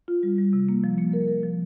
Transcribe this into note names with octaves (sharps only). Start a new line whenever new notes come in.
F4
G3
G3
C3
A#3
F3
A#3
A#4
A#4
F3